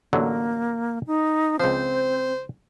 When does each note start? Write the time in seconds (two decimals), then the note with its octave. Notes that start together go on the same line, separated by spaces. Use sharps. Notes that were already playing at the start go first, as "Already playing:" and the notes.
0.13 A1 D3 F#3 A#3
1.07 D#4
1.60 C#2 F3 C4 C5